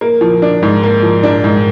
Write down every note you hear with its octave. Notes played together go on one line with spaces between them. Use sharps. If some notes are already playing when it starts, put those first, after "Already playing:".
A#3
F3
D4
G#2
A#3
F3
D4
G#2